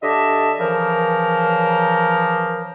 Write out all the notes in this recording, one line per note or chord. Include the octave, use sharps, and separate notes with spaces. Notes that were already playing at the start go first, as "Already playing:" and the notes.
D3 G4 D#5 E5 A5
C#3 E3 F3 A#4